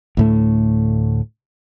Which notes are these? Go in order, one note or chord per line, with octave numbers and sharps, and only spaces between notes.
D2 A2 A3